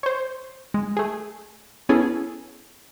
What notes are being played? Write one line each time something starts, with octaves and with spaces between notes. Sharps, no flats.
C5 C#5
G#3
A3 G#4
B3 C#4 E4 G#4 A4